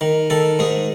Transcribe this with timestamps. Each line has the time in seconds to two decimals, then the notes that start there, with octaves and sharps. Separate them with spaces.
0.01 D#3
0.30 D#3 A4
0.59 G#2 G#4